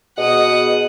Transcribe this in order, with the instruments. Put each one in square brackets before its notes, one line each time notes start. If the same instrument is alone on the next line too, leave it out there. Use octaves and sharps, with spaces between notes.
[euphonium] B2 [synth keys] G#4 D#5 [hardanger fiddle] F#5 D#6